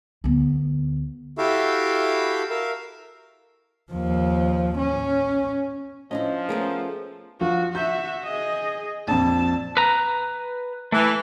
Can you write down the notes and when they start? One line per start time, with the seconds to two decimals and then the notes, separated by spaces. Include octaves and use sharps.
0.24 D2 B3
1.38 E4 F#4 G4 A4 E5 F5
2.50 A#4 E5 F5
3.92 D#2 F3
4.78 C#4
6.11 F3 C#4 D4 E4 D#5
6.49 A3 B3 C#4 F4 G#4 A#4
7.41 F3 F4 F#4
7.75 F#4 E5 G6
8.23 G#4 D#5
9.08 A#1 F2 A5
9.77 B4 A#5
10.92 E3 A3